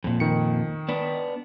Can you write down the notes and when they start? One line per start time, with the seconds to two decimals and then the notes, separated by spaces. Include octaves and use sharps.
0.04 F2 A#2
0.20 D#3 C#7
0.89 B3 D4